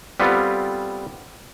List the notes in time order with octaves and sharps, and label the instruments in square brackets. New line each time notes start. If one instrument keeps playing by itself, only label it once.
[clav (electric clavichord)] G3 B3 C4 F4 A4